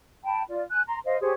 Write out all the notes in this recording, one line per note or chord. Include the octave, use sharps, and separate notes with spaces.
G5 A5 B5
F4 D5
G#5 F#6
A#5 C6
C5 D#5 F5
G4 G#4 C5 C#5